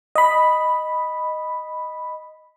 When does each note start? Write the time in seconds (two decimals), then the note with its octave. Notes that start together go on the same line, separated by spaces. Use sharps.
0.15 D#5 B5